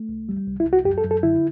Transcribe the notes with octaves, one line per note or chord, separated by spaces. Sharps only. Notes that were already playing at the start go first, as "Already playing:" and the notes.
Already playing: A3
C2
G3
C2
E4
C2
F#4
F#2 G4
A4
F#2
A4
D3 E4